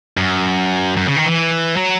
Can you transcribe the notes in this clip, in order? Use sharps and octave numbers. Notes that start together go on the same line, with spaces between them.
F#2
F#2
C#3
D#3
E3
F#3